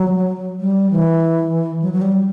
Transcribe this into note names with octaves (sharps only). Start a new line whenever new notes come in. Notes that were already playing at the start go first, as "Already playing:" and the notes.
Already playing: F#3
G3
E3
F#3
F#3
G3